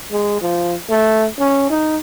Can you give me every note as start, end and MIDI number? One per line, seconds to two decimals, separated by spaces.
0.12 0.40 56
0.42 0.74 53
0.90 1.26 57
1.39 1.69 61
1.70 1.99 63